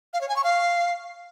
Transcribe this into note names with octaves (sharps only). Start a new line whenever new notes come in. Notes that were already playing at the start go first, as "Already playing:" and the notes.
F5
C#5
G#5
C#6
F5